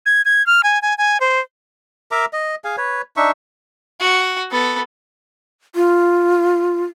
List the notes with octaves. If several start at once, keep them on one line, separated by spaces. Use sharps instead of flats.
G#6
G#6
F6
G#5
G#5
G#5
C5
A#4 E5 A#5 D6
D#5
G#4 F5 G#5
B4 C#5
D4 D#4 E5 C#6
F#4
B3 A4
F4